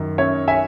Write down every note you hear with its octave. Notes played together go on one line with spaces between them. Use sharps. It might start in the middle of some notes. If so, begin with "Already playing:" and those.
Already playing: F#2 D#3
C#4 C#5 E5
E5 G#5